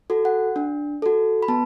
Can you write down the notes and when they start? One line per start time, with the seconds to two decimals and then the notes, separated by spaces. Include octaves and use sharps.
0.10 F#4 A4
0.25 F#5
0.56 D4
1.02 F#4 A4
1.43 B5
1.48 B3 A5